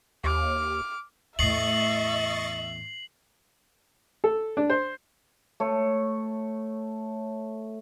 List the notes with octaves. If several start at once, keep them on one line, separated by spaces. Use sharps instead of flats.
D#2 D6 F6
E2 A2 D#5 E5 C#6 A6 C7 F#7
A4
D4
C5
A3 C#5